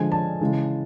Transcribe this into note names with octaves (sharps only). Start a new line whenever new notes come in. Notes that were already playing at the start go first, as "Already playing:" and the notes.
Already playing: D3 F3 G#3 G#5
A5
C#3 E3 G#3